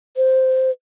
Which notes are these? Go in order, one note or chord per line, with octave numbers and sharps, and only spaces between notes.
C5